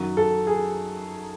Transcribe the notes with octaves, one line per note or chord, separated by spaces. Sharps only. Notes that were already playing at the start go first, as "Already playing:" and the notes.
Already playing: F#2 D#3 F#3
A4
G#4